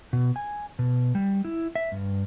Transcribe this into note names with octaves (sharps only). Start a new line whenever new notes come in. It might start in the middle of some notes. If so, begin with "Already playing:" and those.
B2
G#5
B2
G3
E4
E5
G2